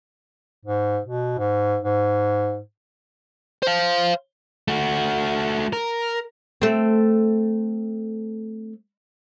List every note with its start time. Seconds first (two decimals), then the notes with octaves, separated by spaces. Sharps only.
0.66 G#2
1.05 B2
1.39 G#2
1.83 G#2
3.63 C5 F5
4.68 A3 F#4
5.73 A#4
6.62 A3 C4